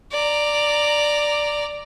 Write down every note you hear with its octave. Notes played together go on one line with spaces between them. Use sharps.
D5 A#5